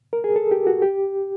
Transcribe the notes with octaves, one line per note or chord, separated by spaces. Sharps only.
A#4
G#4
A4
G4
F#4
G4